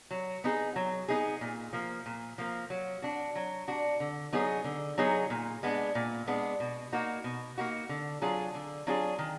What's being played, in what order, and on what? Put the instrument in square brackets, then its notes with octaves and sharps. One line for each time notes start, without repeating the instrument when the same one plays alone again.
[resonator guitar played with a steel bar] F#3
B3 D#4 G#4
F#3
B3 D#4 G#4
A#2
F3 A#3
A#2
F3 A#3
F#3
D4 F#4
F#3
D4 F#4
D3
F#3 B3 D#4 G#4
D3
F#3 B3 D#4 G#4
A#2
G#3 B3 D4
A#2
G#3 B3 D4
B2
A#3 D#4 F#4
B2
A#3 D#4 F#4
D3
F#3 D4 F4 G#4
D3
F#3 D4 F4 G#4
D#3